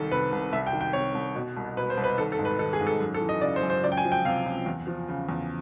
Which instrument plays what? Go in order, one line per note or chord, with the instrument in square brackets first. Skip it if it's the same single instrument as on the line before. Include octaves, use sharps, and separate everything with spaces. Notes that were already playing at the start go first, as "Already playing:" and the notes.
Already playing: [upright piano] C2 D#3 A4
C3 B4
C2
C2 E5
G5
D#3
G5
C3 C#5
C2
B2
C2
B2 B4
C5
C2
B4
D#3 A4
A4
G#2
B4
D#3 A4
G#4
G#2
A4
F#2
A4
E3
D#5
C#3 D5
C5
F#2
C5
C#2 D5
G5
G#5
F3
G5
C3 F5
C#2
E2
F3
C#3
E2